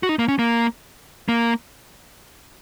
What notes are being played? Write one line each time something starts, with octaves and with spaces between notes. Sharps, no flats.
F#4
D#4
A#3
C#4
A#3
A#3